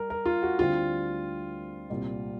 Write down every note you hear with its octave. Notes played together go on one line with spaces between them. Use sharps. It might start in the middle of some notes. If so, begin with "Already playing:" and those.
Already playing: G3 A#4
A#4
F4
F#4
D2 D3 G3 C4 E4 F4
C2 A#2 G3 C4